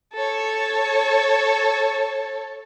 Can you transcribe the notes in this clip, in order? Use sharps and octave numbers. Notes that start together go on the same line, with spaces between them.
A4 C#5